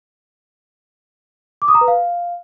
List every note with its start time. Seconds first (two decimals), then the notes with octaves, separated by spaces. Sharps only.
1.62 D6
1.68 D#6
1.75 A#5
1.81 B4
1.88 F5